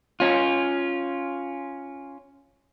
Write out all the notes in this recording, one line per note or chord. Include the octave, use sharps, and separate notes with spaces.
C#4 F4